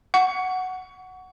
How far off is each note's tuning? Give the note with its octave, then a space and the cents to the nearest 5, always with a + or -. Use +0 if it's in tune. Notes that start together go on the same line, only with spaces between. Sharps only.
F#5 +0 C#6 +30